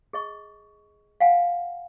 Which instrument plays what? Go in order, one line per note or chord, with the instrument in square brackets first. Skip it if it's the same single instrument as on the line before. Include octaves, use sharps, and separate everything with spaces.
[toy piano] G#4 D#5 C#6
F5 F#5 G#5